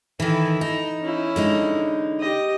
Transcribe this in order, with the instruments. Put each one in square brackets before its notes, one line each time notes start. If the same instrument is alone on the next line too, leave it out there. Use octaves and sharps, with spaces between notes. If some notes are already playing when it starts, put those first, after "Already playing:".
[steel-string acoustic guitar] D#3 E3 [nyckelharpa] E4 A4
[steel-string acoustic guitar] D#4
[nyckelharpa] C#4 E4
[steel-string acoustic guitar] D3 G#3 D#4
[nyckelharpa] G4 D#5